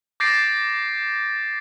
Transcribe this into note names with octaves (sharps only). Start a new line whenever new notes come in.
D6 G6 A6 A#6 C7 D7